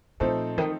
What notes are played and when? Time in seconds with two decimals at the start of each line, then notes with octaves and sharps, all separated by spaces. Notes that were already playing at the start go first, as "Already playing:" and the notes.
0.20 A#2 F3 A3 C4 D#4 A4
0.58 D#3